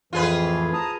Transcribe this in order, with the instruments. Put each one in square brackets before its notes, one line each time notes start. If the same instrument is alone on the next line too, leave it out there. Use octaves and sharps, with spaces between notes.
[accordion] F2 A2 E3 [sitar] F4 G#4 B4
[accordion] A5 A#5 D#6